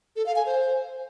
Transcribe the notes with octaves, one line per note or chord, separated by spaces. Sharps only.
A4
F5
G#5
C5